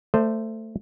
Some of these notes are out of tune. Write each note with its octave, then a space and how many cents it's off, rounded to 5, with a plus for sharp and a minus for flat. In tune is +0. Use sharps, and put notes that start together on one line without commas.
A3 +15 C5 +0 D#5 -45